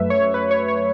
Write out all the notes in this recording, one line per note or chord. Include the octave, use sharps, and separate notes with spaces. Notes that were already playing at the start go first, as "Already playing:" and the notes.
Already playing: F#2 F#3 A3 B4 E5
C#5
B4
C#5
C#5